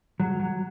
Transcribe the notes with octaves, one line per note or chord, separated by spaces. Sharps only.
F#3
F#3